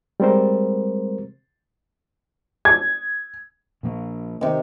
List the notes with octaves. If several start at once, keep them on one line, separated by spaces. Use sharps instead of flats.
G3 G#3 C4 A#4 C5
G#6
A#2 F3 A#3
C3 D#3